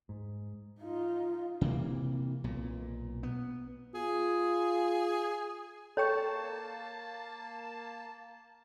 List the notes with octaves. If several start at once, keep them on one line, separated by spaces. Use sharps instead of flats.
G#2
D#4 F4
C3 E3 A#3
B1 A#2
B3
F4 G#4
A#3 A4 C#5 G5 A5 C#6